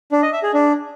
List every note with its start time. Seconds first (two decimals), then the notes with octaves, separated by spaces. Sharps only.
0.12 D4
0.22 D#5
0.33 E5
0.43 G#4
0.54 D4